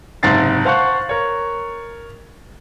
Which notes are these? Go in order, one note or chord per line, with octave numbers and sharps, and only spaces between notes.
F#1 G#2 C3 A6 C7
C5 F5 F#5 A5 C#6 F#6
A#4 C#5